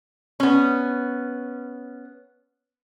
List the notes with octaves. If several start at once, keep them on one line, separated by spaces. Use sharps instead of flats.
B3 C#4